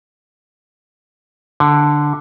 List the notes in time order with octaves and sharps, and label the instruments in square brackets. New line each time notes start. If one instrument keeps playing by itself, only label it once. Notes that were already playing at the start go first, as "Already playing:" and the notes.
[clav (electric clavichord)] D3